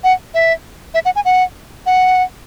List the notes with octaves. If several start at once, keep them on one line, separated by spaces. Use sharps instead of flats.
F#5
E5
E5
F#5
G#5
F#5
F#5